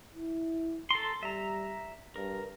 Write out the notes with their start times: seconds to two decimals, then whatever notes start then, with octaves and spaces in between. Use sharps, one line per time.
0.15 E4
0.91 A4 A#5 C6
1.23 G3 E5 A#5
2.16 G2 A#4